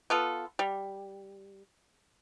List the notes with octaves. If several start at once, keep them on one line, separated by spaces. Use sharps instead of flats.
B3 F4 A4
G3